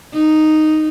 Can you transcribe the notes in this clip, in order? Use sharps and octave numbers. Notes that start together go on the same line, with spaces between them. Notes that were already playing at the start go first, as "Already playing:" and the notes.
D#4